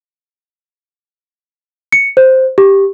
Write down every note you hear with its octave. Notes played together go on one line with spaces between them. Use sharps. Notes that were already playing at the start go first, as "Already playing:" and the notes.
C#7
C5
G4